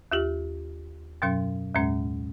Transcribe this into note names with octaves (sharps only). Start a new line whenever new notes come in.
D#2 F4 G4
F#2 B2 F#3 C#4
D#2 A2 G#3 C#4